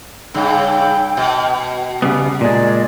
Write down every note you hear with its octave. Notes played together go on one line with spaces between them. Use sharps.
G2 C#3 G5
B2
C#3 G3 B3
A#2 G#3 D5